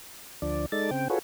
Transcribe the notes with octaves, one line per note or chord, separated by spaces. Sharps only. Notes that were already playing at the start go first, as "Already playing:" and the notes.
D2 F3 D4 D5
G#3 D#4 A4 D5 A6
C#3 C4 G5
F4 F#4 G#4 A4 B4 C#5